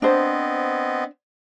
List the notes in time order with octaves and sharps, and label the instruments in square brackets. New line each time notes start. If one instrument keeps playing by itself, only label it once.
[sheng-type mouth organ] B3 C4 D#5 [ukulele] D4 C5